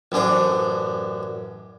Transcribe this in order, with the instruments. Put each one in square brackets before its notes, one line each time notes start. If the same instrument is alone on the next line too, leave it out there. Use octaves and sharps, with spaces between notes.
[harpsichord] A1 F#2 D4 C5